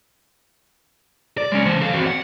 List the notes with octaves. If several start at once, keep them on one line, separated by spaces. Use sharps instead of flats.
D5
G#3 C#4
E3 C5
A4 F5
C4 F#4
F#5